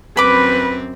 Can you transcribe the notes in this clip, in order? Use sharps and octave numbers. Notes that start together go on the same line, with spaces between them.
F#2 C4 B4 B5 D6